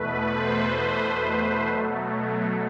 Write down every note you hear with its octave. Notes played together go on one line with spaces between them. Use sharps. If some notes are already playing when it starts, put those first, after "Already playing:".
Already playing: E2 B2 A3 B4
C5
B2 F#3 A3